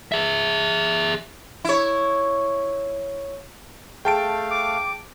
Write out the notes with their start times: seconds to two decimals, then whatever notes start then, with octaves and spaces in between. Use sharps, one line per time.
0.12 G#4 E5
1.65 E4 C#5
4.05 A3 G#4 F5 G5 A5 D7
4.51 D6